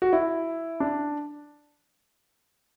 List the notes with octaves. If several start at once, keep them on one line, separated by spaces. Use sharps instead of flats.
F#4
E4
D4